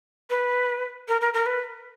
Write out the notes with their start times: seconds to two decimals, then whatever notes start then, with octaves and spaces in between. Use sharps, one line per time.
0.30 B4
1.08 A#4
1.21 A#4
1.34 A#4
1.46 B4